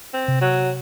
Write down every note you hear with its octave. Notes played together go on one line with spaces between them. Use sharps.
C4
C3
F#3